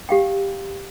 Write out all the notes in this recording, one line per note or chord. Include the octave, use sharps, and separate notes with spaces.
G4 F5 G5